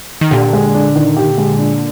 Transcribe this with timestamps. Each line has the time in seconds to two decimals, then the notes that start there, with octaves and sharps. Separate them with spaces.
0.21 D#3
0.31 A#2 D3 G4
0.53 G#3
0.74 D4
0.96 D#3
1.17 G4
1.38 G#3
1.59 D4